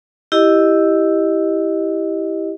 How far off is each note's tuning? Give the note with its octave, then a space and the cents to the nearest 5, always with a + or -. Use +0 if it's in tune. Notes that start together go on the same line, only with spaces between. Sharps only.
E4 -5 G4 +0 D#5 +0